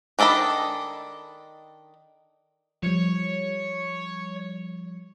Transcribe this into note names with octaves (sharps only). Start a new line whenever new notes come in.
D#3 D4 A4 D#5 B5
F3 G3 C#5